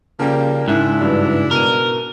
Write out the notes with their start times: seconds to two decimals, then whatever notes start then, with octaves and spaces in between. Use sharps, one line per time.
0.20 C#3 F3 G3 A#3 A#4 G5
0.68 G#2 C#3 D4 E4
1.01 G2 E3 F#3
1.51 B2 A#4 D#7